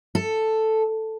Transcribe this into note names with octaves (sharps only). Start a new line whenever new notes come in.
A4